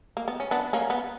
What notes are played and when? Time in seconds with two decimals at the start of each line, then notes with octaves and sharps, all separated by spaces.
0.17 A#3
0.28 B3
0.40 C#4
0.51 B3 D4
0.73 A#3 C#4
0.90 B3